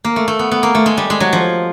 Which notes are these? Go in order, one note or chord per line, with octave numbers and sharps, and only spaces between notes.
A#3
A3
A3
B3
B3
A#3
A3
G#3
G3
G#3
F#3
F3